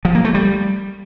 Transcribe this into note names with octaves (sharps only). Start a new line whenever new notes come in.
F3
A#3
A3
G3